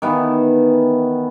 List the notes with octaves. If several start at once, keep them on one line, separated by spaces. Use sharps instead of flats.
D#3 E3 B3